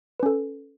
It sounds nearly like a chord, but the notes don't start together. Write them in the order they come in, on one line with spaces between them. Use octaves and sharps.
B4 C#4 A4